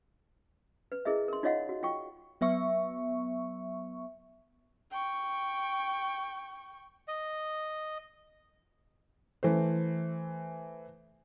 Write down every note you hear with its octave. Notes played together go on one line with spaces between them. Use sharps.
B4
E4 G#4 A#4 D#5 E5
A#4 C6
D#4 F4 C#5 D#5 F5 F#5
F#4
F4 G5 C#6
F#3 B3 E5 C#6
G5 C#6
D#5
E3 A3 C5